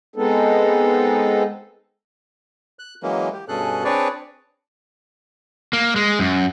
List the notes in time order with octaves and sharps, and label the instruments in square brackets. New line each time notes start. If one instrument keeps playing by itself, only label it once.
[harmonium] G#3 B3 C4 D#4 A4
[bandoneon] F#6
E3 F#3 G#3 A#3 C#4
G4
G2 B2 C#4 G#4 A4 F#6
C4 D4 G#4 B4 C#5 D5
[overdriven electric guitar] A#3
G#3
F#2